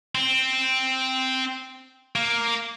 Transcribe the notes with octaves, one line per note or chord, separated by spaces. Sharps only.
C4
A#3